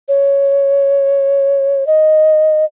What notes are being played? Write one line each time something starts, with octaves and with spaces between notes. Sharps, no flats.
C#5
D#5